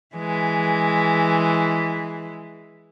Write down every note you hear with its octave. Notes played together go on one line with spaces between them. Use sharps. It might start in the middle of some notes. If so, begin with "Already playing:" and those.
E3 G#3